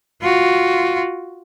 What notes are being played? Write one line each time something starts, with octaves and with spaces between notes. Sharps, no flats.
F4 F#4